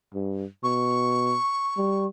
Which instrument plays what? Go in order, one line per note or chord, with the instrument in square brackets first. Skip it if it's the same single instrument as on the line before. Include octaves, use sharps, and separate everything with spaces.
[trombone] G2
[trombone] B2 [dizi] C#6
[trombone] G3